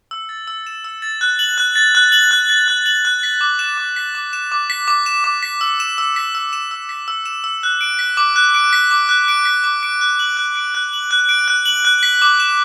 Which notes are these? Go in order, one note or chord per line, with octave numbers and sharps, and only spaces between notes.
E6
A6
E6
E7
E6
A6
F#6
F#7
F#6
A6
F#6
F#7
F#6
A6
F#6
F#7
F#6
B6
D6
E7
D6
B6
D6
E7
D6
B6
D6
E7
D6
B6
E6
E7
E6
B6
E6
E7
E6
B6
E6
E7
E6
F#6
D7
B6
D6
F#6
D7
B6
D6
F#6
D7
B6
D6
D7
F#6
F#7
F#6
D7
F#6
F#7
F#6
D7
F#6
F#7
F#6
B6
D6
E7